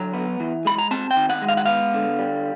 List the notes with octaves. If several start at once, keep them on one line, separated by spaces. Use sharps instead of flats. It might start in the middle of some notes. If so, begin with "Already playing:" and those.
Already playing: D3 F#3 A#5
B3
E3
G#3 B5
A#5
C4 A5
G5
D#3
F#5
G#3
F5
F#5
B3 F5
D3
G3